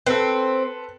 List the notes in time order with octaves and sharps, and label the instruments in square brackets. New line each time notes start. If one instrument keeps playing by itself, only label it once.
[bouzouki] C4 [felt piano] A4 B4